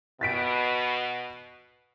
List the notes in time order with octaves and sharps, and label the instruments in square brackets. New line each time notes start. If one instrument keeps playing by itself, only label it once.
[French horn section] B2 [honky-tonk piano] A6 B6 D7